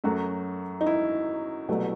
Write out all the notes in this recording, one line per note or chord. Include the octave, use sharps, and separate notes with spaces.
F#2 F#3 A3 F#4
D#4
E4
C2 B2 F#3 A3